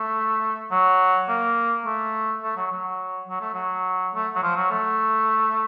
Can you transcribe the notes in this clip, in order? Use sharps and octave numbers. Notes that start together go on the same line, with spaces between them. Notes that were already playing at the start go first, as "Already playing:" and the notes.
Already playing: A3
F#3
A#3
A3
A3
F#3
F#3
F#3
A3
F#3
A3
F#3
F3
F#3
A3